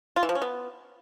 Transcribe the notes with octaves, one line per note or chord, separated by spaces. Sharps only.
F4
E3
F3
C#4
B3